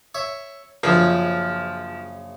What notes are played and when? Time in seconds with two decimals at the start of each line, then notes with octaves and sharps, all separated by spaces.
0.15 C#5 E5
0.83 A#1 F#2 C#3 F3